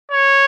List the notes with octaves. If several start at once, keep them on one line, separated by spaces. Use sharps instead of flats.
C#5